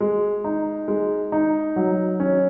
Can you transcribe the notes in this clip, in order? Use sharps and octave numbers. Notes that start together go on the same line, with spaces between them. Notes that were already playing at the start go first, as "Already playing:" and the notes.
G#3
D#4
G#3
D#4
F#3
C#4